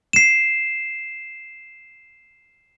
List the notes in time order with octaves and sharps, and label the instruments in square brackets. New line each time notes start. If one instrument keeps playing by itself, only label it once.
[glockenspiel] C7 E7